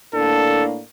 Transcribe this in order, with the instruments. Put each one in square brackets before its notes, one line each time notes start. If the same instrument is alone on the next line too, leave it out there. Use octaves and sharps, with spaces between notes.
[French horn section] A2 A#3 D4 [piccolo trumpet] A4